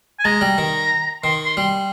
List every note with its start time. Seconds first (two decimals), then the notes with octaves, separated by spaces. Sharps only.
0.19 G#5
0.25 G#3 A#5
0.41 G3
0.58 D#3
1.24 D#3 C6
1.45 C6
1.57 G3 C6